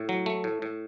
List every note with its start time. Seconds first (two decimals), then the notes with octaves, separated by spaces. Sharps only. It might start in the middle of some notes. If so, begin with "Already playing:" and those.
Already playing: A2
0.09 F#3
0.26 A3
0.44 A2
0.62 A2